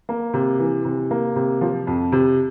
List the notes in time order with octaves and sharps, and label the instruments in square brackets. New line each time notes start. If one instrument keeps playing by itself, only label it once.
[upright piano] A#3
C3
E3
C3
A#3
C3
F3
F2
C3